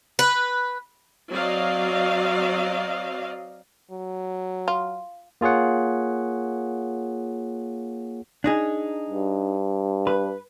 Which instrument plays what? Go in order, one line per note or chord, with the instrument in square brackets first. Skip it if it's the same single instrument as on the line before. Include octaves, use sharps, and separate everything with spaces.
[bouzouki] B4
[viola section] F#3 C4 D5 D#5 F5
[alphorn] F#3
[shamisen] F4
[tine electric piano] A#3 F4 G#4 C#5 F#5
[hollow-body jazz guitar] D4 D#4 G#4
[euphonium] G2
[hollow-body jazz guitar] B4